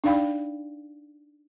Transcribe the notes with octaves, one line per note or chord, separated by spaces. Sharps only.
D4 D#4 D5 F5 G5 B5